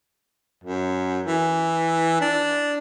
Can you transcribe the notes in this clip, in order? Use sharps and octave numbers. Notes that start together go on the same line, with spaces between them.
F#2
E3
D4